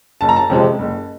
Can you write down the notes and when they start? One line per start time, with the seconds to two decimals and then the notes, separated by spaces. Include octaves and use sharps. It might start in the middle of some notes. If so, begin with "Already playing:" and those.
0.21 F#1 A5
0.29 A#5
0.36 A5
0.50 F2 C3 F3 G#3
0.79 F#1